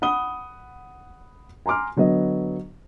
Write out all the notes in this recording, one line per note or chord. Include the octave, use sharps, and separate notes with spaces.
F#5 B5 D#6 G7
G#5 A#5 C6 D6 F6
D3 F#3 B3 D#5